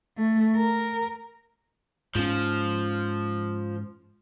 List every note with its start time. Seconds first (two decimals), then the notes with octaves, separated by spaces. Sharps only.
0.18 A3
0.56 A#4
2.15 G#2 F3 C#4